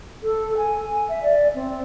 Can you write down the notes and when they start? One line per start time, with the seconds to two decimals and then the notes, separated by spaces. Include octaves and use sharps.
0.23 A4
0.57 G#5
1.09 E5
1.23 D5
1.55 C4